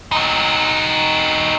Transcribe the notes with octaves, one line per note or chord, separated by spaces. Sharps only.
D#4 F#4